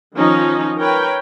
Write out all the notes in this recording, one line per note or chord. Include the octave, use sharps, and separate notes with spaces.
D#3 F3 C#4 D#4
A#4 B4 C#5 G5